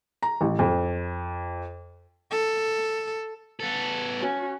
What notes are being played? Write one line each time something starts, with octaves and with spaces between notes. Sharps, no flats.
A#5
A1
F2
A4
B3 A4
C#4 F#4